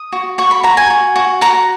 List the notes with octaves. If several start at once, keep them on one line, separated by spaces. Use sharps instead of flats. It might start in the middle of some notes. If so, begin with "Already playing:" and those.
Already playing: D#6
F#4
F#4 C#6
B5
F#4 A#5
G#5
F#4
F#4
F#4 A#5